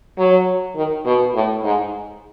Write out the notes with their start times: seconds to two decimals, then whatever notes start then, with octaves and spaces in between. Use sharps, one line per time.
0.18 F#3
0.76 D#3
1.05 B2
1.34 A2
1.63 G#2